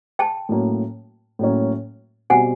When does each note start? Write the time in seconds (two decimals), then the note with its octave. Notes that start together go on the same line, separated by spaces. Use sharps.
0.19 G5 A5
0.49 A2 F#3 A#3 C#4
1.39 A2 F#3 A#3 C#4
2.30 B2 G3 C4 F#5 G#5